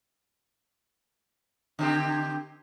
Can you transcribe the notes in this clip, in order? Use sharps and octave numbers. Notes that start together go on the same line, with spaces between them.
D3 C4 G4